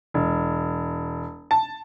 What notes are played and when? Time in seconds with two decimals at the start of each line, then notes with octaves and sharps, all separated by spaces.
0.14 E1
1.51 A5